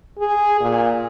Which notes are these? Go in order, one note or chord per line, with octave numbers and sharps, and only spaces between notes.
G#4
A#2